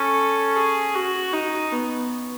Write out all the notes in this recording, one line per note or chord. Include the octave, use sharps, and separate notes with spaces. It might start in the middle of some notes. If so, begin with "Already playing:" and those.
Already playing: C#4 A4
G#4
F#4
D#4
B3